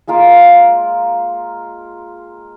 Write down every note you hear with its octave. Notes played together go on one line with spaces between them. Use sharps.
G#3 A#3 F4 A#4